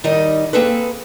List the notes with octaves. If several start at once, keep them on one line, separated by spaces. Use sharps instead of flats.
D#3 G3 D#4 D5 D#5
A#3 C4 G#4 A4 B4